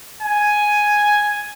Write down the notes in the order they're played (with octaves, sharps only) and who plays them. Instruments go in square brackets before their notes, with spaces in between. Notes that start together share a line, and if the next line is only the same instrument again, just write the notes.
[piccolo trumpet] G#5